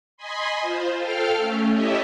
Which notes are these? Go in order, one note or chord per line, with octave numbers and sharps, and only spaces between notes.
D#5 G#5 B5 C6
F4 C5
A4 F5 G5 F6
A3 C#4
E4 G4 A4 C#5 D#5 E5